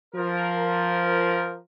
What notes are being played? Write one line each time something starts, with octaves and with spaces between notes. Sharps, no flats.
F3 A#4